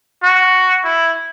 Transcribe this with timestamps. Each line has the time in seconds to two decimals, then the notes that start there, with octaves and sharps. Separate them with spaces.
0.23 F#4
0.84 E4